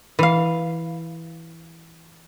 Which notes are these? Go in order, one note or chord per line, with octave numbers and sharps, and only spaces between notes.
E3 F5